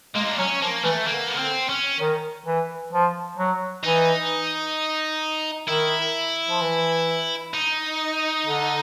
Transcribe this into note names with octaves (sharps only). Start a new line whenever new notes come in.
G#3 A#3
D#4
D4
F#3 C#4
F3 A#3
E3 A3
D3 A#3
B3
C4
C#4
D#3
E3
F3
F#3
E3 D#4
D#3 E4
F3
E3
D#4
D3